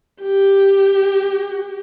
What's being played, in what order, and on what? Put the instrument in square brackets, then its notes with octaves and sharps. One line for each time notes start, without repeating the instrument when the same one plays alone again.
[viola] G4